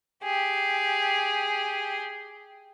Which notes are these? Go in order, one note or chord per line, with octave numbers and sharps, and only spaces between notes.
G4 G#4